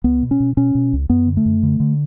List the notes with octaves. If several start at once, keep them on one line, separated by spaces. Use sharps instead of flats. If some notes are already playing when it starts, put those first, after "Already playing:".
C#2 B3
B2
C#4
B2
B2 C#4
B2
C#2
F#2 B3
D3
A3
F#2
D3
D3